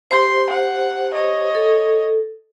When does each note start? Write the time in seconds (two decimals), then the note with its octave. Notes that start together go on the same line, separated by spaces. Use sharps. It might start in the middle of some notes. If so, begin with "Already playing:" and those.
0.11 G4 C5 C6
0.50 F#5
1.13 C#5 D#5
1.55 A4